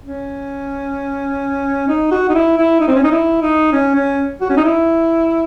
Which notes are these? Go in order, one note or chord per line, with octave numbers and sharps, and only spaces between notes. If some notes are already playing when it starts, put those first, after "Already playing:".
C#4
D#4
F#4
D#4
E4
E4
D#4
C4
C#4
D#4
E4
D#4
C#4
C#4
F#4
C#4
D#4
E4